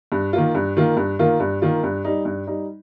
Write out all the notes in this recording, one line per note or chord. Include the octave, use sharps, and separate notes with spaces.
G2
D#3 A#3 F4
G2
D#3 A#3 F4
G2
D#3 A#3 F4
G2
D#3 A#3 F4
G2
G3 D#4
G2
G3 D#4